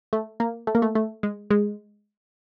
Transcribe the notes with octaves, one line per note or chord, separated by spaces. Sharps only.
A3
A#3
A3
A#3
A3
A3
G#3
G#3